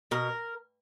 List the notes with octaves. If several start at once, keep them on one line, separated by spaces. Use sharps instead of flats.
B2 A#4